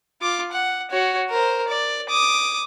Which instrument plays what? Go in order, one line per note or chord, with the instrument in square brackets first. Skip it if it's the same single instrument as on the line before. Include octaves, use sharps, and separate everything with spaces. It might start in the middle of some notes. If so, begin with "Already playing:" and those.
[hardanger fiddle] F4 D6
F#5
F#4 C#5
A#4 C5
D5
D6 D#6